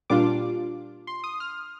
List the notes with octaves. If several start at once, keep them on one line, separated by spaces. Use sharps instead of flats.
A#2 G3 D4 F4 D6
C6
D#6
F6